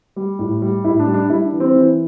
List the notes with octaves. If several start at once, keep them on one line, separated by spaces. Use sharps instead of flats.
G3
A2
G3
A2 E4
D4
G3
D4
G3 E4
D4
E3
C4
E3